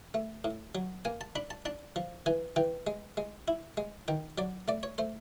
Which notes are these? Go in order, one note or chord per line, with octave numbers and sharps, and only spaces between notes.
A3
A2
F#3
A#3 G#5
A5
D4 B5
A5
D4 A5
F3
E3 G#5
E3 G5
G#3
G#3
E4
G#3
D#3 G5
F#3 D5
A3 D5
C#5
A3 C5